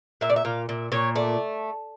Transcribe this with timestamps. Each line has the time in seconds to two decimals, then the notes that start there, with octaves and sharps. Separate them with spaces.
0.21 A#2 E5
0.30 D5
0.36 E5
0.45 A#2 F5
0.69 A#2 E5
0.92 A#2 C#5
1.16 A3 D5